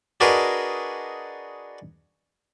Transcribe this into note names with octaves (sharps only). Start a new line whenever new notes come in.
D4 F#4 G#4 A#4 B4 D#5